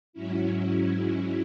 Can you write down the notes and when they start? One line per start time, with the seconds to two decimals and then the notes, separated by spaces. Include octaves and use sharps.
0.13 G#2 F#3 C#4 E4